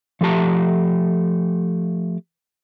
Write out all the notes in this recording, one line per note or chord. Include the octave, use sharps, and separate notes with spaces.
F3 A3 G4 A5 A#5